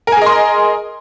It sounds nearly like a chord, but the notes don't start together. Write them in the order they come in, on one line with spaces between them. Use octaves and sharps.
A#4 G#5 G#4 D#5 C6